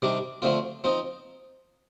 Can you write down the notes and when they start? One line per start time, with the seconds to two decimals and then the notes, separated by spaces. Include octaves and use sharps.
0.02 C3 D#3 G3 D4
0.42 D3 F3 A3 C4 F4
0.84 F3 C4 D#4